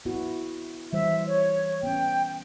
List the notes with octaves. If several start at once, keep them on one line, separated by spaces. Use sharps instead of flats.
B3 E4 F#4
E3 G3 C5 E5
C#5
B3 C#4 G5